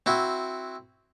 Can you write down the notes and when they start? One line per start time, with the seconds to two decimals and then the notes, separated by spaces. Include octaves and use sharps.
0.06 C4 E4 F#4